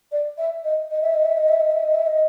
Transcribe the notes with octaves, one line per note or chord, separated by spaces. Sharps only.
D5
E5
D#5
D#5
E5
D#5
E5
D#5
E5
D#5
E5
D#5
E5
D#5